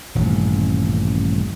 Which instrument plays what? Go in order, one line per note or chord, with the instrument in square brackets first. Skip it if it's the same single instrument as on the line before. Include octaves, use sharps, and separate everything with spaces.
[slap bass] D#1 A1 G2 C3